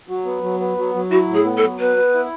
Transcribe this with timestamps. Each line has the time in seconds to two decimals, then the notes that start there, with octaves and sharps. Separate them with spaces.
0.08 F#3
0.25 B3
0.42 F#3
0.60 B3
0.77 F#3
0.95 F#3
1.11 E4 F#4
1.28 A2
1.34 G#4
1.45 B3
1.57 A4
1.63 F#3
1.80 B3 B4
1.96 B3
2.14 E4